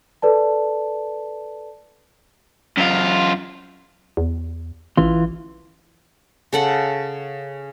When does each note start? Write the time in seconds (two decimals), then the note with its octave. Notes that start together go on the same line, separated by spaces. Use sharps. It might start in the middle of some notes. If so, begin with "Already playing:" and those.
0.22 A4 B4 D5 A5
2.78 F#2 F4
4.17 E2
4.97 A1 E3 F4
6.53 C#3 A4 F#5